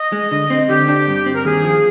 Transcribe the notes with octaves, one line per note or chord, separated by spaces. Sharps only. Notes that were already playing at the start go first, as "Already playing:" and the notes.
Already playing: D#5
G#3
D3
C4
D3 G4
D4
G2
C4
A#4
D#2 G#4
F3